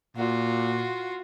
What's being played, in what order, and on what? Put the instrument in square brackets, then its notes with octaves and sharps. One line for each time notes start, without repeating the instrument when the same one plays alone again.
[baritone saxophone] A#2 [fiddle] F4 F#4